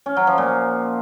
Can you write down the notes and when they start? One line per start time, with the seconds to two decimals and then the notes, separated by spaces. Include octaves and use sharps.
0.06 C#4
0.17 F#3
0.27 F3
0.38 A#2